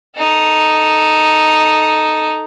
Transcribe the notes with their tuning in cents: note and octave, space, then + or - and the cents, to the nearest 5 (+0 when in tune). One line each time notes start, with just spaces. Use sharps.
D#4 +0 A4 +0